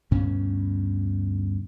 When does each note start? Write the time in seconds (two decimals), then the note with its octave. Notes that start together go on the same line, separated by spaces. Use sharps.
0.11 D2 G2 B2 C#4